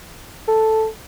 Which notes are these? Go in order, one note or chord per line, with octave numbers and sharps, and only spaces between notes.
A4